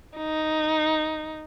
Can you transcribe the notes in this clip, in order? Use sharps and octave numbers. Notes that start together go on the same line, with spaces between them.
D#4